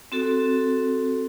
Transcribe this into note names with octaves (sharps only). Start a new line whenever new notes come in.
C4 F#4 A4